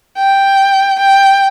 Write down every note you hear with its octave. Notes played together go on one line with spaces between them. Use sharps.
G5
G5